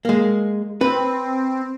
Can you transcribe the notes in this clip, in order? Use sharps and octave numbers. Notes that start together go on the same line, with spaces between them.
G#3 A#3
C4 B4